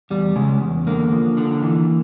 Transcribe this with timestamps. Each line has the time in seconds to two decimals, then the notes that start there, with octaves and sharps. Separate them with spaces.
0.10 E2 G3
0.36 C#3 G#3
0.61 E2
0.87 D3 A#3
1.13 F3
1.37 D3
1.63 E3